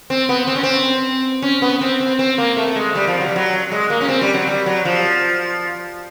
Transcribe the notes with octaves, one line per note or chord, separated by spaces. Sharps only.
C4
B3
C4
C#4
C4
C#4
B3
C4
C4
C4
A#3
A3
A3
G#3
G3
F3
F#3
G3
F#3
G#3
A#3
C#4
C4
G3
F#3
G3
F#3
F3